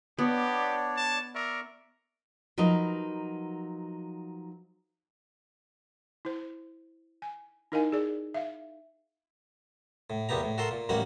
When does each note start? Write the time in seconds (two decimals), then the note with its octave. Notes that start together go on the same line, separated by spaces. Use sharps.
0.19 B3 D4 G4 C#5 D5
0.97 A5
1.35 A#4 D5 E5 C#6
2.58 F3 F#3 D#4 A#4 B4 D#5
6.25 E4 C5
7.22 G#5
7.72 D#4 E4 A#4 D#5 F5 G#5
7.92 G#4 D5
8.34 E5 F5
10.10 A2
10.29 E2 A#2 B3 G4 A#5
10.43 A2
10.58 F#4 A4 A#4 C6
10.71 A#2
10.89 A1 F#2 G3 A#3 F#4 F#5